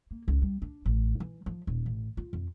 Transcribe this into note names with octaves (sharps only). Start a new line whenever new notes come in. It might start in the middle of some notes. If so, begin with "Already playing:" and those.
A#3
C#2
G3
D4
A1
E3
F3
D#1
A1
F4
F2